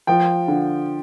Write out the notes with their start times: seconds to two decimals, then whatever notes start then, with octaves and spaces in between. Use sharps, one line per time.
0.07 F3 G5
0.48 D3